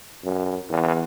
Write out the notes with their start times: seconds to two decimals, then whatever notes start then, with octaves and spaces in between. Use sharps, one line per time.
0.24 F#2
0.70 E2